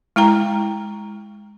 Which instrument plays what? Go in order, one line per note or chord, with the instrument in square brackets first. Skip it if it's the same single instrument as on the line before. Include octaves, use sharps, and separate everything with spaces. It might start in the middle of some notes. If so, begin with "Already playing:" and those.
[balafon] G#3 E4 G5 A#5